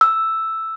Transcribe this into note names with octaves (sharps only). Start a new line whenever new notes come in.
E6